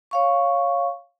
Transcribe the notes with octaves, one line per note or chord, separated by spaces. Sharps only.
C#5 F5 C#6